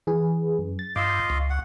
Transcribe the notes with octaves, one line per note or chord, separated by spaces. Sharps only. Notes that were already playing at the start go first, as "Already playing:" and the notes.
E3 G#4 B4
F#2
A6
G2 F4 D#5 F5 D6 E6
C#2
F#5